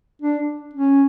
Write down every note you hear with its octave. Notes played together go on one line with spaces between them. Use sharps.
D4
C#4